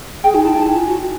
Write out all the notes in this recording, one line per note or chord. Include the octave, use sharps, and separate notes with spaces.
G#4 G5
D#4 G#5
E4 A5
D#4 A5
E4 G#5
F4
F#4